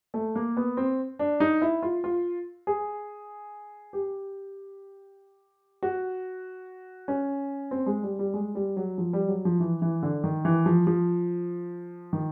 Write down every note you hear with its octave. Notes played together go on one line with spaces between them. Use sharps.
A3
A#3
B3
C4
D4
D#4
E4
F4
F4
G#4
G4
F#4
C#4
C4
G#3
G3
G3
G#3
G3
F#3
F3
G3
F#3
F3
E3
E3
D3
D#3
E3
F3
F3
D#3